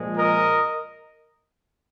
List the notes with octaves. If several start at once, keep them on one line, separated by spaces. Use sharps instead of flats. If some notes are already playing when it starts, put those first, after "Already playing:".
Already playing: A#2 F3 G#3
A#4 D#5